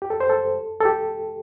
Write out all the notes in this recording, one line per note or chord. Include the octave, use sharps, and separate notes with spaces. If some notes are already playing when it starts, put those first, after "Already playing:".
G4
A4
C5
A4
A4
G4